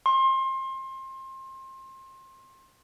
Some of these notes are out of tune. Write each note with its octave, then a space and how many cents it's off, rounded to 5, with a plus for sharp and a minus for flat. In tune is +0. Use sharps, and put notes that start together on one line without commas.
C6 +25